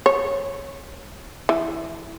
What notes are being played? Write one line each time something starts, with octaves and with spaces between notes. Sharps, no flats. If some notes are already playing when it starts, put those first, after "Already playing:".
C#5
E3